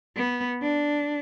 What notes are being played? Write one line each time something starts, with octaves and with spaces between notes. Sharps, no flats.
B3
D4